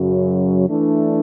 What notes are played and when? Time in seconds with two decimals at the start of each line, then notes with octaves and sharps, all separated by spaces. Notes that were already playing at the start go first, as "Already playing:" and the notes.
Already playing: F#2 C#3 F#3
0.68 E3 A3 D4